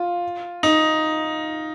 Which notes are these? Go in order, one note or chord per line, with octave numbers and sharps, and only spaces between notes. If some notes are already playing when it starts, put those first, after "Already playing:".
Already playing: F4
D#4